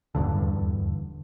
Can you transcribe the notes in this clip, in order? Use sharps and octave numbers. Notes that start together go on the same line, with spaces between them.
D#1 E2 G2 D3